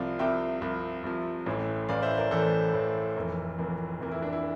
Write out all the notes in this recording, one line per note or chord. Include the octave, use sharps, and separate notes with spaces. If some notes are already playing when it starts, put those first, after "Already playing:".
Already playing: C2 C3 F3 D5 F5
C2 C3 F3 E5 G5
C2 C3 F3
C2 C3 F3
A1 A2 E3
A1 A2 E3 D5 F5
C5 E5
A#4 D5
A1 A2 E3 A4 C5
A1 A2 E3
F1 F2 E3 A#3
F1 F2 E3 A#3
F1 F2 E3 A#3
E4
D4
E4